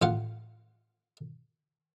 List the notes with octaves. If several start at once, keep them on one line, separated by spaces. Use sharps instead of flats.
A1 F4 F5 F#5